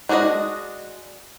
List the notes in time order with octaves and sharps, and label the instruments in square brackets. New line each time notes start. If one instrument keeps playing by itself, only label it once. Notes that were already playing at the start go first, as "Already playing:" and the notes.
[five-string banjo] G#3 D4 F#4 G#4 D#5